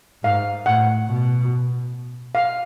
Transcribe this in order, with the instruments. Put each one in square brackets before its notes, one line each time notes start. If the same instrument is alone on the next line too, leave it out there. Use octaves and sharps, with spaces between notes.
[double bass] G#2 [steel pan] F5
[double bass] A2 [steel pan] F#5
[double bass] B2
[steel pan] F5